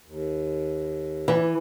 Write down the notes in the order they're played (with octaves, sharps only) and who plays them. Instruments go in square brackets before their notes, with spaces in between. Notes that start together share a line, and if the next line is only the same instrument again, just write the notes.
[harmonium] D#2
[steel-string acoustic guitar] E3